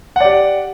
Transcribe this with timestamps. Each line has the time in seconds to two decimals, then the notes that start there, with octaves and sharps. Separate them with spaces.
0.16 F#5
0.20 D5
0.25 G4